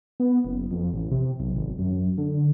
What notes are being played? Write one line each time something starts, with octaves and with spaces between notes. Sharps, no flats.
B3
F#1
F2
A1
C3
B1
G#1
F#2
D3